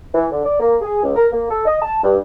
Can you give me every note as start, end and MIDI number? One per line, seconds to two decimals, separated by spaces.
0.14 0.25 52
0.31 0.43 50
0.44 0.60 74
0.60 0.75 58
0.81 1.02 68
1.03 1.11 37
1.16 1.26 70
1.32 1.48 58
1.50 1.65 69
1.66 1.79 75
1.82 2.02 81
2.03 2.18 43